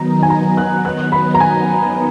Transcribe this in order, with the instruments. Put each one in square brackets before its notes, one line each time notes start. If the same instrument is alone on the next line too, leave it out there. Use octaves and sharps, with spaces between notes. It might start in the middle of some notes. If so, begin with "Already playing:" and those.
Already playing: [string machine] D#3 F#3 B3 D#4 [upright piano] A#5
[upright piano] G#5
A#5
F#6
F#6
B5
A#5
G#5